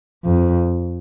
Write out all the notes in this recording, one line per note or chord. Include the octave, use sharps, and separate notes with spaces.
F2